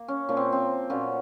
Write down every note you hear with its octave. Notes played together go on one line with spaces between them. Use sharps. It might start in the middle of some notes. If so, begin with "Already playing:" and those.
Already playing: A#3
C#4
A#2 F3 A#3 C#4
C4
C4
A#2 F#3 B3 C#4